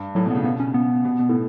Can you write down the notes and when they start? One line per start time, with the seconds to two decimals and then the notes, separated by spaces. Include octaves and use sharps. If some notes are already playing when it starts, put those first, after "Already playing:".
Already playing: G2
0.15 A2 F#3
0.26 B2
0.30 C#3 B3
0.44 B2 B3
0.60 C#4
0.74 B3
1.05 B2
1.19 B2
1.29 A2